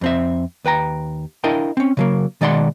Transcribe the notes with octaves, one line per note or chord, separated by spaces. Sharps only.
F2 C4 E5
D#2 B4 G5 A#5
D4 E4 A#4 D#5 F5 G5
C4 C#4
C#3 F#3 A#3
B2 D#3 G#3 D5 F#5 C6